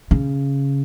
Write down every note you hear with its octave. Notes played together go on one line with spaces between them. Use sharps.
C#3